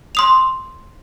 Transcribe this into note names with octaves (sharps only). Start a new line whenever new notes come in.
C6 D#6 F7